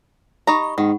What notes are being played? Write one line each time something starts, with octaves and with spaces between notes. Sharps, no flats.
D#4 G4 A#5 B5 C#6
G#2 D#3 F#5